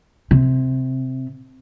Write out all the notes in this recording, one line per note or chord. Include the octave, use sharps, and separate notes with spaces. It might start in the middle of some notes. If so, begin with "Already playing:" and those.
C3